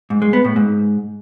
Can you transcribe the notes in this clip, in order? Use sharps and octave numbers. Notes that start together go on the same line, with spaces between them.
G#2
G#3
B3
A2
G#2